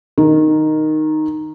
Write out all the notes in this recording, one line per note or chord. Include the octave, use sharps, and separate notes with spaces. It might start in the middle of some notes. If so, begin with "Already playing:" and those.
D#3